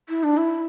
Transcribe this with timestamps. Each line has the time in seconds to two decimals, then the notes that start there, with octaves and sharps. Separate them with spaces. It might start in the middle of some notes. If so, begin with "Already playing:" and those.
0.09 E4
0.23 D4
0.37 E4